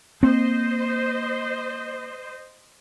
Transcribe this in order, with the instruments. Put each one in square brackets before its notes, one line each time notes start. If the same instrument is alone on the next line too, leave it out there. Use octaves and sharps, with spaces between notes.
[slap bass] A#3 [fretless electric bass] C4 [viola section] C5 D#5